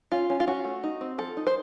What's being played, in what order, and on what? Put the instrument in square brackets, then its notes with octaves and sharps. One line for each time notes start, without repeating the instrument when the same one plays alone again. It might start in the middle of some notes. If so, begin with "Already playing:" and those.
[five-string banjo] C#4 F4
C#4
F4
C#4 F#4
A3
D#4
C4
F3 A4
D#4
C5